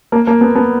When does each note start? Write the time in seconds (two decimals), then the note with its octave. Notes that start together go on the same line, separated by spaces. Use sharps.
0.12 A#3
0.27 A#3
0.41 B3
0.55 B3